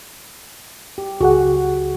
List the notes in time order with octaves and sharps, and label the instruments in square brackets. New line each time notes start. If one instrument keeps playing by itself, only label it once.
[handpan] G4
[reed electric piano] C#2 G#4 F#5 [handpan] F#4